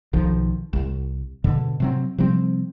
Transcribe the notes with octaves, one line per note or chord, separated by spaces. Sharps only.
B1 D#3 F3
C2
G#2 B2 D3
C3 F#3 C4
C3 F3 G3 C4